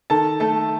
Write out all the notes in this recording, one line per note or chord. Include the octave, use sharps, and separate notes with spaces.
D#3 A4 A5
A3 A4 A5